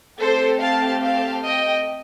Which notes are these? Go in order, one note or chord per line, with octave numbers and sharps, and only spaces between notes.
A3 C4 G4 A4 C5
F5 A5
F5 A5
D#5 G5